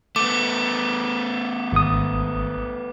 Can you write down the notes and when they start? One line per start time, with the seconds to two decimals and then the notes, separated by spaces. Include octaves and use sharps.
0.16 A3 B3 D6
1.72 G#1 D#6